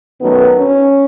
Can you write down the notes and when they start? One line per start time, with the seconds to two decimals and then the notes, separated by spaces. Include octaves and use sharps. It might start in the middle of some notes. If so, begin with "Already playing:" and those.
0.21 F#2 D#3 F#3 A3 B3
0.58 C#4